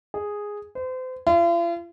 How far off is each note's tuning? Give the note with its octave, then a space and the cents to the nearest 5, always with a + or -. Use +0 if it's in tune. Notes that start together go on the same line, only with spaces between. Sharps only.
G#4 -5
C5 -35
F4 -45